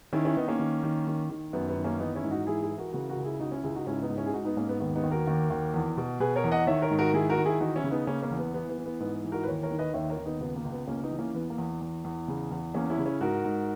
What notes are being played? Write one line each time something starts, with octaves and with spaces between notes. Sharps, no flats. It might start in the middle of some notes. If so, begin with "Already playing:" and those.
D#3 C#4 E4
C#4 E4
D#3 B3 D#4
A#3 C#4
D#3
D#3
D#3
D#3
F#2 B3
B3
D#3
A#3 C#4
E3 B3 D#4
C#4 E4
G#2
D#4 F#4
E3 E4 G#4
E4 G#4
E3
F#4 A#4
C#3 F#4 A#4
F#4 A#4
C#2
E4 G#4
C#2 D#4 F#4
C#4 E4
C#2 E4 G#4
D#4 F#4
G#2 C#4 E4
B3 D#4
G#2
C#4 E4
G#4
G#2 D#4 F#4
B3 D#4
G#2 A#3 C#4
B3
D#2 B3
B3 D#4
D#2
F#4 A#4
D#2
D#2
E2
B2
B2 G#4 B4
A#4 C#5
E2
D#5 F#5
D#3 C#5 E5
A#4 C#5
G#2
F#4 A#4
D#3 E4 G#4
F#4 A#4
D#3
E4 G#4
E3 D#4 F#4
C#4 E4
C#3
B3 D#4
C#3 A#3 C#4
A#3 C#4
E2
B3
E3 B3
B3
E3
B3
G#2 B3
E3
F#4 A#4
B4
D#2 A#4 C#5
A#4 C#5
D#3
B4 D#5
D#2 C#5 E5
A#4 C#5
D#2
B3 D#4
C#2 B3
A#3
C#2
B3
C#2 A#3 C#4
B3 D#4
E3
A#3 C#4
E2 B3
A#3
E2
E2
E2
C#3
E2
E2 A#3 C#4
C#4 E4
C#3
C#4 E4
G#2 F#4 A#4
G#2